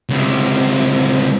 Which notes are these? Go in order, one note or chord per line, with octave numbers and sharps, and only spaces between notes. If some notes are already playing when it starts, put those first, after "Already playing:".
C#2 C3